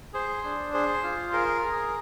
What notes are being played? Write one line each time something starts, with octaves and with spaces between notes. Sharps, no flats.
G#4 C5
D4
G#4 C5
F4
G#4 A#4
G#4